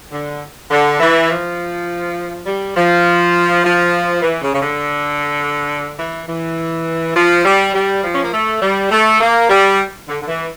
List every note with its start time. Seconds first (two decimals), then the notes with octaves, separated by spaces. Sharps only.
0.12 D3
0.71 D3
1.00 E3
1.30 F3
2.47 G3
2.76 F3
3.64 F3
4.22 E3
4.42 C#3
4.54 C#3
4.61 D3
5.98 E3
6.28 E3
7.15 F3
7.45 G3
7.74 G3
8.04 F3
8.14 C#4
8.24 A#3
8.32 A3
8.62 G3
8.91 A3
9.21 A#3
9.50 G3
10.08 D3
10.21 D3
10.28 E3